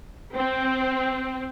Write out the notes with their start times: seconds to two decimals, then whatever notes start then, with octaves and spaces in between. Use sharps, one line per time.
0.35 C4